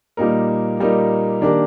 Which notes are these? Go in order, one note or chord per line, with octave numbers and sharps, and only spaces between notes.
A#2 G3 A#3 D#4 A#4
A#2 G3 A#3 D#4 A#4
D#3 A#3 D4 G4 A#4